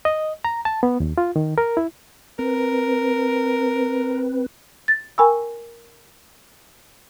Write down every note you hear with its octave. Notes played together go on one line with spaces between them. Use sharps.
D#5
A#5
A5
B3
D#2
F4
D#3
A#4
E4
C4 A#4 B4
A6
A#4 G5 G#5 B5 C#6 E6